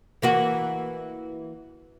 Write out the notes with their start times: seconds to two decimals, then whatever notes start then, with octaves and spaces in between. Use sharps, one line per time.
0.22 E3 A#3 F#4